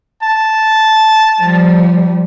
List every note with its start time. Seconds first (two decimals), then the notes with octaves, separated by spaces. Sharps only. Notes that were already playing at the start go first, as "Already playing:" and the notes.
0.22 A5
1.40 F3 G3